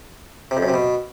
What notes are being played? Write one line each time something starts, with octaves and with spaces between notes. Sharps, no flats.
C3
F2
F#2
C3
B2